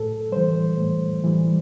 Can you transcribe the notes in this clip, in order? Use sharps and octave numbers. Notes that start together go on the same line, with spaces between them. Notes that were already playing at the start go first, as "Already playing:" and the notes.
Already playing: A2 A4
E3 G3 C5
A2
E3 G3